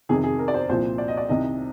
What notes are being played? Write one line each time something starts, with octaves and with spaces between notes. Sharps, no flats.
F2 C3 D#3 G#4
G#4
A#4
D5
C5
C2 A#2 F3 C5
D5
D#5
D5
C2 C3 D#3 D#5